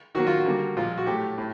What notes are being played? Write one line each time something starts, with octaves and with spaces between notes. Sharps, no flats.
D#3 F#3 A#3 F#4
F4
F#4
D3 G3 A#3
A#2 F3 G#3 F4
F#4
A2 F#3 A3 G4
A2